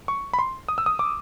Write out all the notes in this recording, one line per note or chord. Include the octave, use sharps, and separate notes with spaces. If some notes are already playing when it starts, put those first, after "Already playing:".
C#6
B5
C6
D#6
E6
D#6
D6